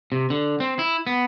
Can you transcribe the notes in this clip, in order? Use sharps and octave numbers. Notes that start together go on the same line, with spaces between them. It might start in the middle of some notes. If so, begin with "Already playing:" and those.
C3
D3
C4
E4
B3